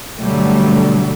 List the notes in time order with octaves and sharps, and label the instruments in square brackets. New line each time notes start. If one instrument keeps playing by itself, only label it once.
[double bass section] G2 B2 D3 F#3 G3 A3